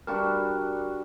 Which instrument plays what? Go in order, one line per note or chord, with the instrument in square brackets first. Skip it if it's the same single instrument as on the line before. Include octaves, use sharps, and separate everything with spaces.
[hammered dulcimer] G3 D4 F#4 [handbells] A#4